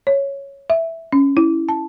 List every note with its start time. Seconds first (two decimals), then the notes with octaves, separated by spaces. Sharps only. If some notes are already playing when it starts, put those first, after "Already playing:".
0.07 C#5
0.70 E5
1.12 C#4
1.37 E4
1.69 A5